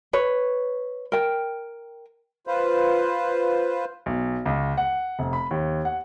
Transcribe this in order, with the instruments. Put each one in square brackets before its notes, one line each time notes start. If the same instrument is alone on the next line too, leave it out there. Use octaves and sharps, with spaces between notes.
[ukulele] B4 C#5
A#4 G5
[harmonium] F4 B4 C5
[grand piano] B1
C#2
F#5
F1
B5
D#2
F#5